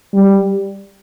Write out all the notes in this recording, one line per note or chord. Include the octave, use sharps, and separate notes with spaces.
G3